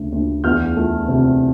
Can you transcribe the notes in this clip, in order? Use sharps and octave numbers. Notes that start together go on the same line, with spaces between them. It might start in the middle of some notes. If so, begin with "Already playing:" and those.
Already playing: D2 C#3
D2
E2 F6 G6
A3
C3